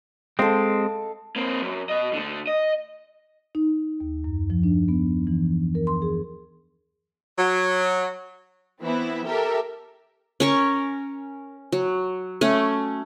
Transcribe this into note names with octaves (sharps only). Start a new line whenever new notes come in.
G#3 C4 A4 D#5 F5
A#3 C4
F#2
B2 D#5
D2 D3
D#5
D#4
D#2
F#2
F3
D4
B3
E3
A#4
C6
G#4
F#3
E3 B3 C4 E4
G4 A4 A#4 E5
C#4 A#4 C#6
F#3
A3 C#4